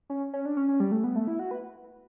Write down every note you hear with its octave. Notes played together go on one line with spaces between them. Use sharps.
C#4
C#4
D4
C#4
C#4
G3
A3
B3
A3
E4
F#4
B4